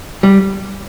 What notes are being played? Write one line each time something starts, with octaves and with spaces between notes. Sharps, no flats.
G3